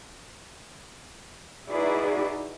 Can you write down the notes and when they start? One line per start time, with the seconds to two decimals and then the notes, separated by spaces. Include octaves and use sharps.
1.69 D#4 E4 F#4 G#4 B4 D5